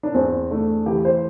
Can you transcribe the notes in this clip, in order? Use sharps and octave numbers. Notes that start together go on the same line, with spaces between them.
D4
E2 C4
A3 D4
E3 G4
C5